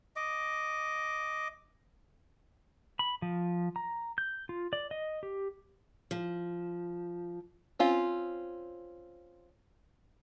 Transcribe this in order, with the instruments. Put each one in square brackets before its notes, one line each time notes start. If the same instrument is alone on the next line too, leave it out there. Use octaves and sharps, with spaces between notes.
[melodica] D#5 D6
[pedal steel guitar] B5
F3
A#5
G6
F4
D5
D#5
G4
[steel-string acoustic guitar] F3
[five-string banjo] C4 C#4 F4